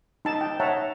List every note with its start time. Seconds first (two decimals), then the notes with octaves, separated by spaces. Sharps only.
0.25 D#4 A5
0.41 G5
0.60 C#5 E5 F#5 A5 A#5